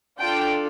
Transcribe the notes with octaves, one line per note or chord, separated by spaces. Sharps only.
D4 F4 A4 G5